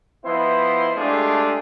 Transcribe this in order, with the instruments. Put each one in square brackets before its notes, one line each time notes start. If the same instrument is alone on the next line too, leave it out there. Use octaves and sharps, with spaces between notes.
[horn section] F3 B3 E4 C5 D#5 C6
G#3 A3 D4 F4 G4 G#4